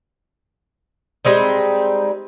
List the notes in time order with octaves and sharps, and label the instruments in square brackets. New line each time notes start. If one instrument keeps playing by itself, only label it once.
[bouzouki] G3 G#3 C4 D#4